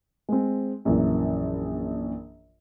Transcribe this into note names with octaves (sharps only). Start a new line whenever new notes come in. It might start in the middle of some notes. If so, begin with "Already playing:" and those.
G#3 C4
A#1 F#2 E3